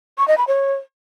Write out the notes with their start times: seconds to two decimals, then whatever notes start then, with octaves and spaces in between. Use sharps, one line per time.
0.18 C#6
0.28 D#5
0.38 B5
0.48 C#5